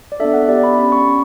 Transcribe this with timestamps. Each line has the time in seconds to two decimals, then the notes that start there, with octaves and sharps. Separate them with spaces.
0.12 D5
0.20 B3 D4 A4 E5
0.34 F#5
0.49 B3 E4 G4 D5
0.64 B5
0.77 C#4 G4 B5
0.92 C#6
1.07 C#4